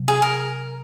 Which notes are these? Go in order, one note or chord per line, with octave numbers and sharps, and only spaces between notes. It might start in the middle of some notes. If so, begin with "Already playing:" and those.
Already playing: C3 F#3
G#4
A#4